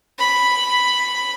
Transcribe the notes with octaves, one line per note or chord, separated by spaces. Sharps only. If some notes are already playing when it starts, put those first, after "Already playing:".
B5